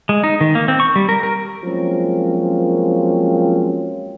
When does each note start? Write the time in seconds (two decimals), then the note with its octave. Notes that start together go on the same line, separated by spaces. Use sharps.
0.09 G#3
0.24 D#4
0.41 D#3
0.55 A#3
0.68 C4
0.80 C#6
0.96 G3
1.09 A#4
1.23 A#4
1.63 F3 F#3 G#3 A#3 C4 C#4